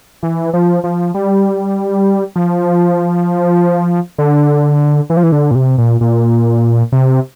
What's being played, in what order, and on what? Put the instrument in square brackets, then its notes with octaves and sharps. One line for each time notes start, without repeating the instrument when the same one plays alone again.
[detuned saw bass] E3
F3
F3
G3
F3
D3
E3
F3
E3
D3
A#2
C3
A#2
A#2
C3